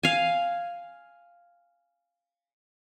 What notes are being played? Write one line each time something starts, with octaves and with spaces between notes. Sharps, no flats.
F5 G#5